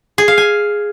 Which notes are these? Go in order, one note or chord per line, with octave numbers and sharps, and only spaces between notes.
G#4
F5
G#5